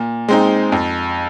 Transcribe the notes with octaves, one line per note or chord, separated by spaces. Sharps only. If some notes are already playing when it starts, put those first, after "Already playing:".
Already playing: A#2
G#3 C4 D#4
F2